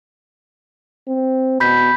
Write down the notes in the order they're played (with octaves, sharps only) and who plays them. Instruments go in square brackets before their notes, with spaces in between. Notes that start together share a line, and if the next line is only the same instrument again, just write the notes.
[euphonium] C4
[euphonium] B2 [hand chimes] B5 G6 B6